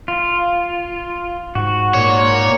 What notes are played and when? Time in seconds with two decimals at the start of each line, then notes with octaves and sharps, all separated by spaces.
0.08 F4
1.55 G#2 F#4
1.94 A#2 C#5